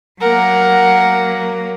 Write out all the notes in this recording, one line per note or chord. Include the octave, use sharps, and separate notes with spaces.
F#3 A#3 A#4 F#5